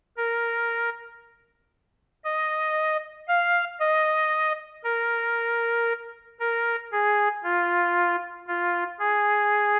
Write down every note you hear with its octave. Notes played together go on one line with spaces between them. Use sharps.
A#4
D#5
F5
D#5
A#4
A#4
G#4
F4
F4
G#4